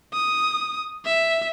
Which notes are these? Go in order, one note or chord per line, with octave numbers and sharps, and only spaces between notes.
D#6
E5